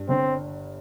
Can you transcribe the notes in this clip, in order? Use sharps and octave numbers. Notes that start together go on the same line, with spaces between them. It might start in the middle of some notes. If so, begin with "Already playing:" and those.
Already playing: G2
G1 C4